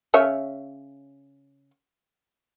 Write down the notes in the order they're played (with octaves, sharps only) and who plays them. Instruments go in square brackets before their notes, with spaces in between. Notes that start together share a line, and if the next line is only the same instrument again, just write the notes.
[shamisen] C#3 C#5 E5